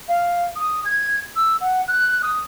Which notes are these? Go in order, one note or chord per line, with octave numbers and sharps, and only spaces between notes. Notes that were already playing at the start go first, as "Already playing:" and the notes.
F5
D#6
G#6
E6
F#5
F#6
D#6